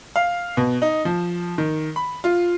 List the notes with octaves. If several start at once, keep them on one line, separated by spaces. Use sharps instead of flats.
F5
B2
D#4
F3
D#3
B5
F4